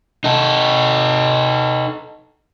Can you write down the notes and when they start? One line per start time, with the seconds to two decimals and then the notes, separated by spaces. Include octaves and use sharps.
0.24 D#4 A4